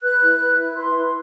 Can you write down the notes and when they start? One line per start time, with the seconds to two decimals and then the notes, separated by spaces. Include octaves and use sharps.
0.03 B4 F#6
0.21 E4
0.40 B4
0.58 E4
0.76 B4 C6
0.95 E4